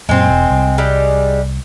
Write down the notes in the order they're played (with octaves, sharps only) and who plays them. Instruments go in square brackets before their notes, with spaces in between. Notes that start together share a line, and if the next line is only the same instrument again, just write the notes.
[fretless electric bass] F#2 A#2 [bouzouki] G#3 C4
[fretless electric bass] E1
C2
[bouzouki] G3 G#3